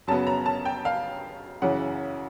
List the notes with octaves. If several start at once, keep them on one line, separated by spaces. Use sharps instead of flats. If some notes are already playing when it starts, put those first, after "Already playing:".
F#2 C#3 F#3 B3 A5
A#5
A5
G5
F5
F#2 C#3 E3 F#5